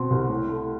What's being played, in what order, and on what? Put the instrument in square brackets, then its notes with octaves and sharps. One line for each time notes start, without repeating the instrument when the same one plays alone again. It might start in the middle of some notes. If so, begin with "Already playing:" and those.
Already playing: [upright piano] B2 C4 [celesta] C6
[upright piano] C2
A2
A3